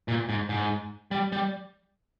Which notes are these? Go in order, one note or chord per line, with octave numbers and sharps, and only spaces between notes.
A#2
G#2
G#2
G3
G3